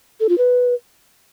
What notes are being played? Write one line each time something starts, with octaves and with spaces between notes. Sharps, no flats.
A4
F4
B4